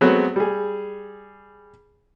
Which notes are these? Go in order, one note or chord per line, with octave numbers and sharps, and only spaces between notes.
F#3 G#3 A3 B3 C4 F#4
G3 G#4